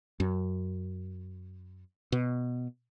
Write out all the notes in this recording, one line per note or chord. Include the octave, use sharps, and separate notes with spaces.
F#2
B2